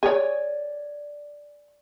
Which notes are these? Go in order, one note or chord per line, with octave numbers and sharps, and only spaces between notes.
G#4 C#5 D5 G#5